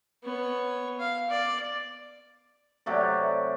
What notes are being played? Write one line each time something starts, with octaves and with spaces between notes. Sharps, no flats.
B3 C#5
F5
D5
C3 F#3 A3 D5